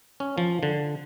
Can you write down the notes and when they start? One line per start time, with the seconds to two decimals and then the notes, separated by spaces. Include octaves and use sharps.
0.20 C#4
0.38 F3
0.63 D3